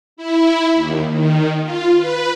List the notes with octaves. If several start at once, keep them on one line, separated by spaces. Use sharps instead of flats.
E4
D#2
D#3
F4
B4